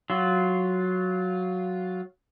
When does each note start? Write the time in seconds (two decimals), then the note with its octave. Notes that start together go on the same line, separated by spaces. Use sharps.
0.10 F#3 F4